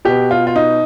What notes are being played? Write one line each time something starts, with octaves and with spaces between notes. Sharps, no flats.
B2 B3 G4
F4
F4
D#4